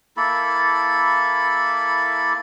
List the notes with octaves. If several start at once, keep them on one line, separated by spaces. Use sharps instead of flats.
A#3 E4 A4 B5